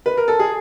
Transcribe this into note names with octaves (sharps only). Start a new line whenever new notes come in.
B4
A#4
A4
G#4